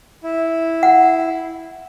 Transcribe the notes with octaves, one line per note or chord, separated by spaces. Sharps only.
E4
F#5